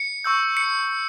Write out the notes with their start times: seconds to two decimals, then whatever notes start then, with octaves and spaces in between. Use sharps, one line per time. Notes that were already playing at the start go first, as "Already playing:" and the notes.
Already playing: C#7
0.24 C#6 E6 G6
0.57 C#7